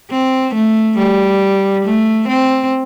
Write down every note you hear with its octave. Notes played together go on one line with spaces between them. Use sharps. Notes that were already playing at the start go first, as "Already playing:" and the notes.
C4
A3
G3
A3
C4